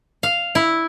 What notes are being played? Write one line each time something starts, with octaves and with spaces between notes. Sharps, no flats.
F5
E4